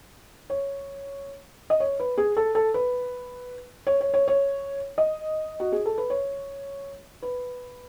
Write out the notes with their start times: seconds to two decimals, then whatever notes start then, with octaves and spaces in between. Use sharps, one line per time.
0.50 C#5
1.70 D#5
1.80 C#5
2.00 B4
2.18 G#4
2.37 A4
2.55 A4
2.74 B4
3.87 C#5
4.01 C#5
4.14 C#5
4.28 C#5
4.98 D#5
5.60 F#4
5.72 G#4
5.86 A4
5.98 B4
6.10 C#5
7.22 B4